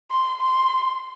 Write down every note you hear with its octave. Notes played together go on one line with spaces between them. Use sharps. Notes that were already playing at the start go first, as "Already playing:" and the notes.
C6
C6